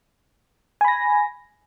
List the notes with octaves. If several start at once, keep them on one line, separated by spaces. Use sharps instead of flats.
G#5 B5 A#6